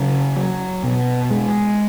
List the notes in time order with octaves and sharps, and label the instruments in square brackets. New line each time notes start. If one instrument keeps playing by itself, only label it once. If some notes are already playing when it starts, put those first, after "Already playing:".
Already playing: [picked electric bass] C#3 F#3
F#3
B2
G#3